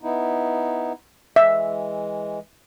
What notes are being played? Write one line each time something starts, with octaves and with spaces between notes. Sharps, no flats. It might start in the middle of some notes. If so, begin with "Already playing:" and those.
B3 D#4 E4
E3 G#3 E5